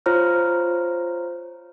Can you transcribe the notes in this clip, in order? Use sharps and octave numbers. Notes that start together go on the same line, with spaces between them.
F4 C5 C#5 A#5 F6